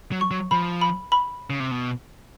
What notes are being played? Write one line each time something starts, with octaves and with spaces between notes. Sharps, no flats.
F#3
C#6
F#3
F3 B5
B5
B5
C#3
C3
B2